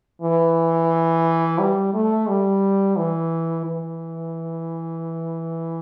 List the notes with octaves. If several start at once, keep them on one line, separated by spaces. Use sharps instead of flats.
E3
G3
A3
G3
E3
E3